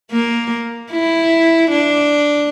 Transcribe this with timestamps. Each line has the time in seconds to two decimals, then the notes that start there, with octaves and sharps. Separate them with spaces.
0.12 A#3
0.92 E4
1.71 D4